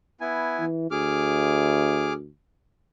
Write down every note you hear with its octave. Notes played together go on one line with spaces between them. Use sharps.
B3 E4 G#5
E3
D2 G#4 D6 F6